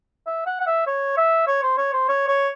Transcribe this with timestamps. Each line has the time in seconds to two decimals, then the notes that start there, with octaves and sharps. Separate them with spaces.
0.27 E5
0.46 F#5
0.60 F#5
0.67 E5
0.87 C#5
1.17 E5
1.48 C#5
1.63 C5
1.78 C#5
1.93 C5
2.09 C#5
2.28 C#5